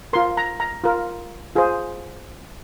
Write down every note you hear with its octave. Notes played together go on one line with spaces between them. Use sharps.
F4 A#4 C6
A#5
A#5
F4 A#4
F4 G#4 C5